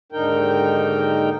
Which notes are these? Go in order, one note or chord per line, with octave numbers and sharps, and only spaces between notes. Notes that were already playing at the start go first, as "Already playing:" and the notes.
D#2 G#2 D3 D#4 A#4 G5